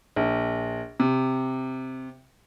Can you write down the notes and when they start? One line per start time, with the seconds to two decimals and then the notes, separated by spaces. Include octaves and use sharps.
0.16 A#1
1.00 C3